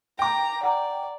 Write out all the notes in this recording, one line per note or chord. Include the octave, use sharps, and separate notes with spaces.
G5 A#5 D6
D5 F#5 A#5